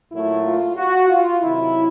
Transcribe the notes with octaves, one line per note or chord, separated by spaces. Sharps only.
A#2 F#3 A3 E4
F4
F#4
F4
C3 D#3 F#3 E4